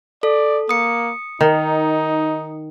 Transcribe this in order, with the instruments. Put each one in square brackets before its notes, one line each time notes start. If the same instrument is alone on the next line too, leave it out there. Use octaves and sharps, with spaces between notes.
[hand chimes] A4 [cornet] D5
[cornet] A#3 [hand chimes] D#6 C#7
[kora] D#3 [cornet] D#4